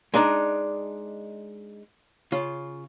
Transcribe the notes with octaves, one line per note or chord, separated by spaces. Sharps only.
G#3 D4 D#4 D5
C#3 F4